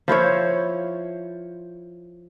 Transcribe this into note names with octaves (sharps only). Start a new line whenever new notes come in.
F3 E4 C5 C#5